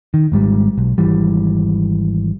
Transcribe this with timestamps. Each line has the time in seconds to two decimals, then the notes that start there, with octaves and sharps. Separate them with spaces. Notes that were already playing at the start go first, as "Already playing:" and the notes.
0.14 D#3
0.32 G#1 G#2 G3
0.78 B1
0.98 G#1 E3 G3